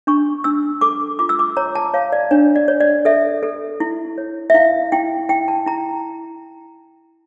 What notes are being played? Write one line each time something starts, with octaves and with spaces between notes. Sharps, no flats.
D4 C#6
D4 E6
A4 D6
F4 D6
E6
D6
C#5 A#5
A5
C#5 F5
D5
D4 C#5
D5
C#5
D5
A4 E5
A4
E4
C#5
E5
E4 F5
E4 G5
E4 G5
A5
E4 A#5